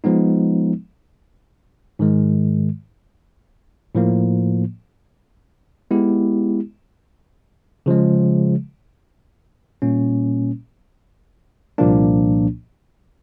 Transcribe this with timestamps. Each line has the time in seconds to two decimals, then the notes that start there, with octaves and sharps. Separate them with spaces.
0.04 F3 G#3 B3 D#4
1.99 G#2 D#3 G#3
3.95 A2 F3 A#3
5.91 G#3 B3 E4 G4
7.86 C#3 F3 G#3
9.82 A#2 G3 A#3 C#4
11.78 C2 A#2 F3 A#3 D4